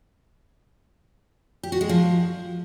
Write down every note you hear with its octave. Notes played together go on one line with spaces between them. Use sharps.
G4
F#4
G#3
F3